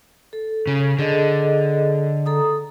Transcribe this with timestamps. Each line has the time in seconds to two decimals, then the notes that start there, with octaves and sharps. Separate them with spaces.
0.33 A4
0.67 C#3
0.99 D3 G#4 A4 D#5
2.26 A4 A#5 D#6